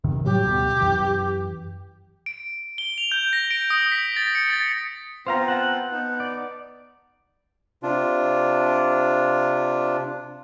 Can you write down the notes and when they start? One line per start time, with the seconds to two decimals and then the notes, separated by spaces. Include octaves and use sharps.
0.04 F#2 C3 D#3
0.24 A2 F#3 G3 G4
0.44 D2 B2
0.81 F#2 E3
2.26 D7
2.78 G7
2.98 F7
3.12 G6
3.33 A#6
3.51 D7
3.70 D#6
3.92 B6
4.17 A6
4.35 C#7
4.50 A6
5.27 B3 C4 F4 C5 F5 A#5
5.48 F#5 A5
5.91 B3 D#4
6.20 D5
7.83 C3 D4 F4